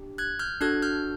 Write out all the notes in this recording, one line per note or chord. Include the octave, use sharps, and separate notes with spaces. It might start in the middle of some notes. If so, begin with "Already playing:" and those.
Already playing: D4 G4
F#6 G#6
F6 G6
D4 F#4 A4 F#6 G#6
F6 G6